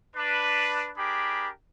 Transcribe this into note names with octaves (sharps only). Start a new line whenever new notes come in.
D4 B4
D4 G4 G#4 A#4 B5 D6